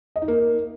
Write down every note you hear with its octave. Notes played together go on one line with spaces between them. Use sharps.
D#5
D#4
A#3